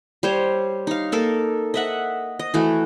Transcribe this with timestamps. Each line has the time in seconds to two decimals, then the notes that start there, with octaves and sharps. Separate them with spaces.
0.23 G3 C5 C#5
0.87 D#4 F5
1.12 A#3 A4 A#4
1.74 D#5 E5 F#5
2.39 D#5
2.54 E3 A3 F#4